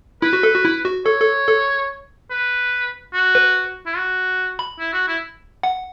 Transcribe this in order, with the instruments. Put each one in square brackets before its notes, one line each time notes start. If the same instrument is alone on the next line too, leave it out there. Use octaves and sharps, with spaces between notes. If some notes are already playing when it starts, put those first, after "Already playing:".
[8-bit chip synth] E4 [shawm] B4
[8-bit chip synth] F#4
A4
F#4
E4
F#4
[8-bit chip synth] A4 [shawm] C#5
[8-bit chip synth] A4
A4
[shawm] B4
F#4
[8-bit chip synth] B4
[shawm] E4
F#4
[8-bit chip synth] B5
[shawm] E4
F#4
E4
[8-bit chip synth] F#5